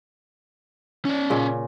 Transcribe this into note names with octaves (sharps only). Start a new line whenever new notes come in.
C#4 D5
A#2 C#3